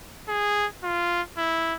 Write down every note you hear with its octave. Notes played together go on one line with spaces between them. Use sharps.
G#4
F4
E4